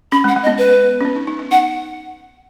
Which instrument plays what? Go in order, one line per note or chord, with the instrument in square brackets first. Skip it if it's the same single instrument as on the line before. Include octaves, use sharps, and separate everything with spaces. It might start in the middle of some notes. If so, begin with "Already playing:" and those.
[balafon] C#4 [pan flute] B5
[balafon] G#3
[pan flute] F#5
[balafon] G#3
[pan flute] D#5
[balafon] B3
[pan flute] B4
[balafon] C#4
B3
D#4
D#4
D#4
[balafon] D#4 [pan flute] F#5